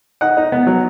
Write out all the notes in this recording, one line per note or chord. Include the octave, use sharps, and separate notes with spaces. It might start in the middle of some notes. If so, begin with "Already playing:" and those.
D#4 F#5
D#4
B3
F#3